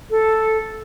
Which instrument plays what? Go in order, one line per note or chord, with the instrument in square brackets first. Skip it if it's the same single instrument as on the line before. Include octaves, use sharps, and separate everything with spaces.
[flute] A4